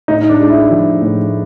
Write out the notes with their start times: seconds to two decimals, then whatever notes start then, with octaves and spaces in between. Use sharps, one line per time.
0.08 A2 D#4
0.29 D4
0.40 G#3
0.50 E4
0.71 F3
1.02 A2